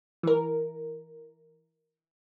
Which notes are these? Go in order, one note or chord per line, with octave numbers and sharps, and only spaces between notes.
E3 A#4